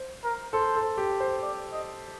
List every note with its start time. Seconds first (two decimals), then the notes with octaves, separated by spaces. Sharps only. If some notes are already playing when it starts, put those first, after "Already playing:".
Already playing: C5
0.24 A#4
0.53 A4 C5
0.76 A4
0.97 G4
1.20 C5
1.42 D5
1.73 D#5